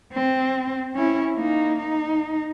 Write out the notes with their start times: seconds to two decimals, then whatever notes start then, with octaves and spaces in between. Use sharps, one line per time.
0.13 C4
0.95 C#4 E4
1.36 A#3 D#4
1.79 D#4